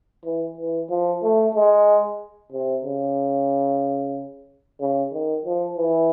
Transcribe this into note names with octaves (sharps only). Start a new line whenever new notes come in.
E3
E3
F3
A3
G#3
C3
C#3
C#3
D#3
F3
E3